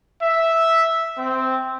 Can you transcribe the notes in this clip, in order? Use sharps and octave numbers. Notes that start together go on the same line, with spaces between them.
E5
C4